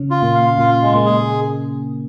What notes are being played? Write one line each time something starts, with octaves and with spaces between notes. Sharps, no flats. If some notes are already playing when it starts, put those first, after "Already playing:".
Already playing: C#3 C#4
F4
A#2 A#3
F5
A#2 A#3 F4
G#3
A#2 A#3
G#4